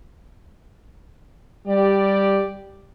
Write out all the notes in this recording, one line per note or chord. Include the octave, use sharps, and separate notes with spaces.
G3 G4 D5